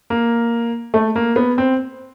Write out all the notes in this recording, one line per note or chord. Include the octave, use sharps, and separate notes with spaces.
A#3
A3
A#3
B3
C4